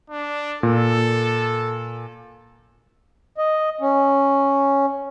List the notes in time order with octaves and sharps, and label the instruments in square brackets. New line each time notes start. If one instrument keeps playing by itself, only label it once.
[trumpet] D4
[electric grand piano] A#2 [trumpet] A4
[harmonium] D#5
C#4